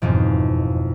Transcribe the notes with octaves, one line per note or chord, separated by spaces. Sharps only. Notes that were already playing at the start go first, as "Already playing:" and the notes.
E1 F2 G#2 B2 G#4